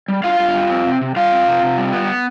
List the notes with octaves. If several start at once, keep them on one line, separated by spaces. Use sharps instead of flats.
G3
G2 F4 F5
G2
G3
C4
C3
C3
G3 F4 F5
C4
C3
C3
G3
B3